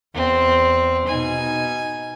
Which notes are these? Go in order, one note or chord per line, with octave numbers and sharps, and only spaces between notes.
E2 C4
B2 D#4 G#5